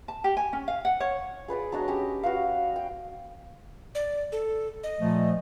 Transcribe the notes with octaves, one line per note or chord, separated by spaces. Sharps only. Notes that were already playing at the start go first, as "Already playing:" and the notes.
A5
G4
G#5
C#4
F5
F#5
C#5
G#4 B4 D5 G#5
F#3 D4 F#4 D#5
C#4 G4
F#4 B4 F5
G5
D5
A4
D#5
A#2 F3 A3